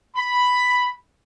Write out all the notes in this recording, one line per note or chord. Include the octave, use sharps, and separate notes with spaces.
B5